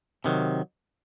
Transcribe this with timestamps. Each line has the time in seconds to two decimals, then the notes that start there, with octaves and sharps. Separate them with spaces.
0.24 C3 D#3 F#3